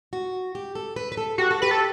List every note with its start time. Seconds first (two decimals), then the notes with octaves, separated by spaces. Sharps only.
0.13 F#4
0.55 G4
0.75 A4
0.96 B4
1.12 B4
1.17 A4
1.38 F#4 G4
1.51 A4
1.62 G4 B4
1.71 A4